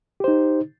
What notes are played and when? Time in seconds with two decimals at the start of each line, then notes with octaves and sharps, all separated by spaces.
0.20 G4
0.24 C5
0.28 D#4